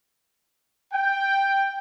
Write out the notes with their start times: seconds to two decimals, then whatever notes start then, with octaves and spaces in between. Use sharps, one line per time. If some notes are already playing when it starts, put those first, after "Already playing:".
0.93 G5